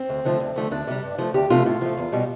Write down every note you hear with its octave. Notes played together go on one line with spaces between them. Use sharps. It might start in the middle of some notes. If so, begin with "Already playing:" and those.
Already playing: C4
D2
D3 F3 A3
D2
D3 F3 A3
D2 D4
C3 G3
G2
F3 A3
D2 G4
C3 F3 A3 F4
A2 F4
F3 A3
E2
B2 G3